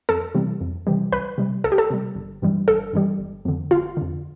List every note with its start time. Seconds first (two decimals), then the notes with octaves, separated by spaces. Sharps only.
0.09 F2 A4
0.35 C3 E3 G3
0.61 F2
0.87 C3 E3 G3
1.12 C2 B4
1.38 C3 G3
1.64 C2 A4
1.72 G4
1.78 A4
1.90 C3 G3
2.15 G1
2.42 G2 E3 G3
2.68 G1 A4
2.93 G2 E3 G3
3.19 G1
3.45 F2 D3
3.71 G1 F4
3.97 F2 D3